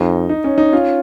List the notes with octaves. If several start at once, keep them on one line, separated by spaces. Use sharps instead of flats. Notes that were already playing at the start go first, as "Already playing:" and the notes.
Already playing: F2 D#4
D#4
C#4
D#4
C#4 F4